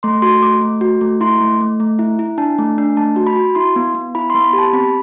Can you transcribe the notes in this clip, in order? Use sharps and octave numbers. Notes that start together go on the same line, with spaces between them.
A3 C6
F#4 C6
A3 D6
A3
F#4
A3
E4 C6
A3
A3
A3
E4
E4
D4 A5
A3
D4
A3 A5
F#4
B5
F#4
E4 C6
B3
B3
E4 B5
C6
B3
B5
G4
A5
C4 B5